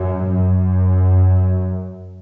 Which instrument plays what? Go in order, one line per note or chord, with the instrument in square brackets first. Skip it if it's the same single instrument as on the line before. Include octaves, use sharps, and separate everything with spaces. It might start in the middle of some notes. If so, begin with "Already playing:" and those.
Already playing: [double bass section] F#2
F#2